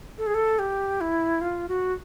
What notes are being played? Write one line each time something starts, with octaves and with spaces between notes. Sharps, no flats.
A4
G#4
A4
G4
E4
F4
F#4